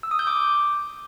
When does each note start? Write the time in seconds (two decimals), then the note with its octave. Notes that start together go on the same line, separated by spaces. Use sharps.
0.03 E6
0.11 D#6
0.19 G6
0.27 D6